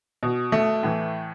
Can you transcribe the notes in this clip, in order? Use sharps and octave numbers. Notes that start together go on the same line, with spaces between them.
B2
A3
A2 E3